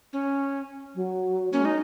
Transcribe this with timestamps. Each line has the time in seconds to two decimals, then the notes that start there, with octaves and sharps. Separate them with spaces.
0.13 C#4
0.95 F#3
1.52 A#3 C#4
1.60 G#3
1.65 D#4